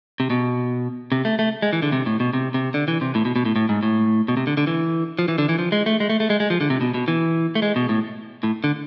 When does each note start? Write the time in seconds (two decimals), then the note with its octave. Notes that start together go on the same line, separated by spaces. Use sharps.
0.20 C3
0.30 B2
1.12 C3
1.25 A3
1.39 A3
1.62 G#3
1.73 E3
1.82 D3
1.92 C3
2.06 A2
2.20 B2
2.33 C3
2.54 C3
2.74 D3
2.88 E3
3.01 C3
3.15 A2
3.25 B2
3.36 B2
3.45 A2
3.56 A2
3.69 G#2
3.83 A2
4.28 B2
4.37 C3
4.47 D3
4.57 D3
4.67 E3
5.19 F3
5.28 E3
5.38 D3
5.49 E3
5.59 F3
5.72 G#3
5.86 A3
6.00 G#3
6.10 A3
6.20 A3
6.30 G#3
6.40 G#3
6.50 F3
6.61 D3
6.70 C3
6.81 B2
6.94 B2
7.08 E3
7.55 A3
7.62 G#3
7.76 B2
7.89 A2
8.43 A2
8.64 D3